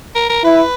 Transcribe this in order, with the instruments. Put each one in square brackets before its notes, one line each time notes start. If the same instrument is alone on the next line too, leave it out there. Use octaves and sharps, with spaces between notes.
[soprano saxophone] A#4
A#4
[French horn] E4 [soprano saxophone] B4